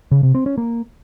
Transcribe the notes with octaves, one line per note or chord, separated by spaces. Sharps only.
C#3
C3
C4
C#4
A#3